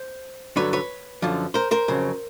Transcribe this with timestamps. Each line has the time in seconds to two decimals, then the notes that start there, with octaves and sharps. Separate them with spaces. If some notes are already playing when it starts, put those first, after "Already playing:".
Already playing: C5
0.56 G2 D3 F#3 B4 C#5
0.73 B4 C#5
1.22 F#2 D3 F3
1.54 A#4 C5
1.71 A#4 C5
1.88 F2 C#3 F#3